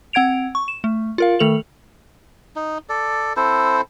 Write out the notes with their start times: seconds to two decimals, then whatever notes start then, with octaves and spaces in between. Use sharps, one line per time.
0.13 C4 F#5 G#6 D7 F7
0.55 C#6
0.68 E7
0.84 A3
1.18 F4 A#4 F5
1.39 D#3 A3 A4 F7 F#7
2.56 D#4
2.89 A4 D5
3.37 C4 E4 A4 C5